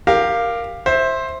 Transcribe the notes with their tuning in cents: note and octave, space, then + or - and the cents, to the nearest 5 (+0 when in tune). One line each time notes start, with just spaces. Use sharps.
G4 +15 A#4 +0 F5 +0
C5 +15 E5 -10